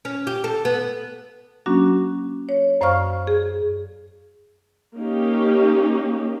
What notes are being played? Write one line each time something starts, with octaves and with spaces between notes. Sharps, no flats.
C#4
G4
A4
B3
F#3 A#3 C#4 D4 F#4
C#5
F#2 C5 D5 F5 C#6 F6
G#4
A#3 C#4 D#4 G4